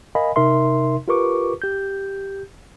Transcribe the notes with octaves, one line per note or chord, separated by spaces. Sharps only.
A#4 D#5 F5 G#5 B5
C3 D#4 A#4 E5 C6
F4 G4 A#4 B4 C#6 D6
G4 G6